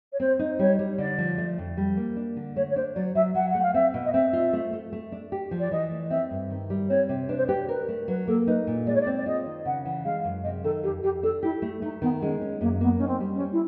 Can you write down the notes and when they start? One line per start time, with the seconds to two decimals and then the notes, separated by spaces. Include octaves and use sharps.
0.12 C#5
0.20 C4 C5
0.39 D#4
0.59 G3 C#5
0.79 G3
0.98 D3 D5
1.18 F3
1.38 A3
1.58 F2
1.77 G3
1.97 A#3
2.16 D4
2.37 D3
2.56 A3 C#5
2.70 C#5
2.76 D4 C5
2.95 F#3 D5
3.15 F#3 E5
3.35 F#3 F#5
3.50 A3 F#5
3.62 F5
3.74 C4 E5
3.94 B2
4.05 D#5
4.13 C4 E5
4.33 F4
4.53 A3
4.73 A3
4.93 A3
5.12 D4
5.32 G4
5.51 F3
5.60 D5
5.71 E3 D#5
5.91 A3
6.10 C4 E5
6.31 G2
6.50 D#3
6.70 G3
6.89 C4 C#5
7.09 C3
7.29 D4 B4
7.37 C5
7.46 B4
7.49 G4
7.68 A#4 B4
7.88 A3
8.08 F#3 B4
8.28 A#3 A4
8.47 D#4 B4
8.67 A#2
8.87 G#3 D5
8.95 C#5
9.01 D5
9.07 C4
9.17 D5
9.26 F4 D#5
9.46 D#3
9.65 C#3 F#5
9.85 E3
10.05 G#3 F5
10.24 F#2
10.44 C3 D#5
10.64 D#3 A4
10.83 F2 G4
11.03 F2 G4
11.23 D4 A4
11.43 E4 G4
11.62 A3
11.82 A3 D#4
12.02 D#3 B3
12.22 G#3 C#4
12.41 C#4
12.61 F#2 A#3
12.81 A#3 B3
12.97 C#4 D#4
13.07 C4
13.20 G3
13.34 C#4
13.40 G3
13.52 E4